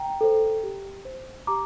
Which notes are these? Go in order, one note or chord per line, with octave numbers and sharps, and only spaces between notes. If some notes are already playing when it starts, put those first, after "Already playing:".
Already playing: G5 A#5
A4 C5
G4
C5
G4 A#5 D6